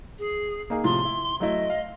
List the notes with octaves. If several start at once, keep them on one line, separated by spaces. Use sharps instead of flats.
G#4
A#3 D#4 G#4
A2 C3 F3 C6
E4
F#3 A3 E4 D#5
F5